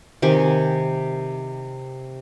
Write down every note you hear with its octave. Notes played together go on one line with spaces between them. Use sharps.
C3 D#3 G4 G#5